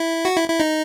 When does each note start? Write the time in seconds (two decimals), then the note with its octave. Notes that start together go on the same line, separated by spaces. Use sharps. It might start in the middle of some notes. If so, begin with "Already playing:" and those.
Already playing: E4
0.25 F#4
0.36 E4
0.49 E4
0.60 D#4